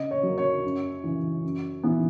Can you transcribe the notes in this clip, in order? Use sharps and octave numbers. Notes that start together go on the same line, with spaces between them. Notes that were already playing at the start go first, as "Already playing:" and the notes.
Already playing: C#3 D#5
C#5
F#3 A#3
C#5
F#2
C#3 E3
F#2
E3 B3